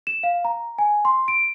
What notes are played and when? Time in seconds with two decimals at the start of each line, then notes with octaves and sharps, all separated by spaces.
0.07 E7
0.23 F5
0.45 A#5
0.79 G#5
1.05 C6
1.28 D7